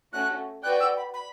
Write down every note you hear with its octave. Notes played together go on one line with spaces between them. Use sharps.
A3 C#4 F#4 F#6
F#4 B4 D5 G5 F#6
E6
B5
B5